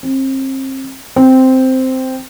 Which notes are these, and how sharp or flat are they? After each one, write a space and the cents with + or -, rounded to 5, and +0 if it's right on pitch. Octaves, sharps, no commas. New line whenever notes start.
C4 +35
C4 -5